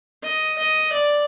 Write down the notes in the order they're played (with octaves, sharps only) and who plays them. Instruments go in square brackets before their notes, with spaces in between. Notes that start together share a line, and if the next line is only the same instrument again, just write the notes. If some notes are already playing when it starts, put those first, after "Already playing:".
[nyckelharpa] D#5
D#5
D5